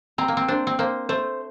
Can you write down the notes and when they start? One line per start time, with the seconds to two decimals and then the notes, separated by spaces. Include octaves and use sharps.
0.18 C4 A#5
0.28 A#3
0.37 C4
0.48 D4 C5
0.67 C4
0.79 A#3 C5
1.09 A3 C5